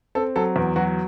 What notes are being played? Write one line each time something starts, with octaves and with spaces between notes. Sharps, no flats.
C4 A4
F#3 A4
E2
F#3 F#4